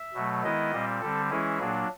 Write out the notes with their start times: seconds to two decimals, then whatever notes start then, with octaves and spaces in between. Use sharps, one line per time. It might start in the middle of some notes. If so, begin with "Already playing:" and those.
Already playing: E5
0.14 B2 F#3 A3
0.43 D#3 G#3 B3 E4 D#5
0.72 A#2 G3 C4
1.01 D3 G3 C4 A4
1.30 E3 G#3 C#4 E4 G#4
1.59 A#2 F#3 A#3 D4